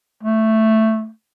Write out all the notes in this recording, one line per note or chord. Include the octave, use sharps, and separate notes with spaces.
A3